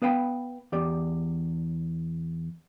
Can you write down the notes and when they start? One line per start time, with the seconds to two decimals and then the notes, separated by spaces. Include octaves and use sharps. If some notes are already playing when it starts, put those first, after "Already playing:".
0.02 B3 B4 F5 G5 B5
0.72 E2 G4 D5